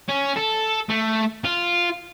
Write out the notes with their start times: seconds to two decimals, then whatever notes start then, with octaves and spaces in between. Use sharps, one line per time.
0.08 C#4
0.36 A4
0.89 A3
1.44 F4